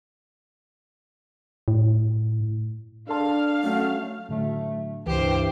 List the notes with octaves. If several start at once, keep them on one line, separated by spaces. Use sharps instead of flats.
A2
D4 A4 F5 A5 C6
F#3 A3 C#4
A2 D3 F#3 A3
C#2 G2 C3 E3 G4 C5